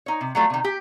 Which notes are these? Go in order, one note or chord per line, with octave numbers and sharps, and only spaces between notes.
D#4 C#5
C3
F#3 G3 A3 F4
C3 D#3
G4